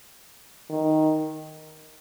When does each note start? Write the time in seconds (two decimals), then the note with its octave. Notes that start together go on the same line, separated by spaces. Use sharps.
0.70 D#3